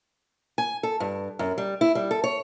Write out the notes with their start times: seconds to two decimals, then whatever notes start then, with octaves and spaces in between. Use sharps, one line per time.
0.58 G#5
0.83 A4
1.00 G2
1.39 F#2
1.58 G3
1.81 E4
1.95 G3
2.11 A4
2.24 C#5